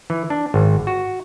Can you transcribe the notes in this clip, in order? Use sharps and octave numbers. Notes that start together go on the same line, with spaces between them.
E3
D4
G#1
F#4